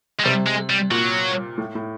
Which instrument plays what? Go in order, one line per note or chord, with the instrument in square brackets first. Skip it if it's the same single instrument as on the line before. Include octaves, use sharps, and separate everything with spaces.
[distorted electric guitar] G#3
[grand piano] C3 [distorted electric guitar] G3
[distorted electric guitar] G#3
G3
[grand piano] A#2 [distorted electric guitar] F#3
[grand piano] A2
A2